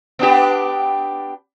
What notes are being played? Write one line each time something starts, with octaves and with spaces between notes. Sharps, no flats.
B3 D4 G4